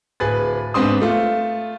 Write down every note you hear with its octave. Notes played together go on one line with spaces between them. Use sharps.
D1 G#4 B4 A6
G#2 B3 C4 D4 C6 D#6
A3 F4